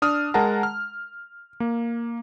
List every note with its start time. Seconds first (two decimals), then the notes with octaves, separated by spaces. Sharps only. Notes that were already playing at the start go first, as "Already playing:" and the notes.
0.02 D4 D#6 F6
0.34 G#3 A#4 F#5 A5 A#5
0.63 F6
1.60 A#3